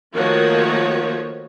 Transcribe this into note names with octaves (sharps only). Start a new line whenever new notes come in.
D#3 F3 A3 A#3 F#4 C#5